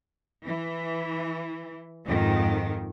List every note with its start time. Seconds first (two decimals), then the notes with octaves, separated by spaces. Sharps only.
0.44 E3
2.08 F2 G#2 D#3